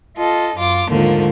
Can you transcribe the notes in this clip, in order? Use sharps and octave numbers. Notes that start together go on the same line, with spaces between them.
F4 A4 D#5
F#2 F4 D6
D#2 G#2 D3 F3 A3 A#3